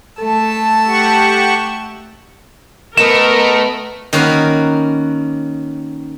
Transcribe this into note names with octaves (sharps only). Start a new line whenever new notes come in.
A3 A4 A5 E6
G4 F#5 C#6
A3 B3 A#4 D#5 E7
D#3 A#3 C#4 F#4 A#4 B4